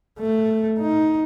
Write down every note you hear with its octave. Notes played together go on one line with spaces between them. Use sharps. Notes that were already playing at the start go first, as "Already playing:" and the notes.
A3
D#4